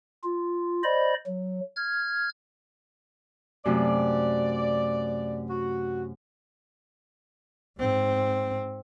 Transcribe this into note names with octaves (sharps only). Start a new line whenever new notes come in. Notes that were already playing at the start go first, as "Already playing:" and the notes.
F4
C5 D5 D#5 B5
F#3
F6 G#6
F#2 C3 A3 D5
F#4
G#2 C4